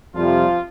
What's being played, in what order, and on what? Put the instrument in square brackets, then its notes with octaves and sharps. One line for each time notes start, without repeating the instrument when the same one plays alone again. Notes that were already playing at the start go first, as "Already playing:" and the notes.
[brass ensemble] F2 C3 G3 [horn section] F3 F4